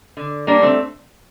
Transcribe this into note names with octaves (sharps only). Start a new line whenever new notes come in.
D3
G3 A#3 D4
A3 C4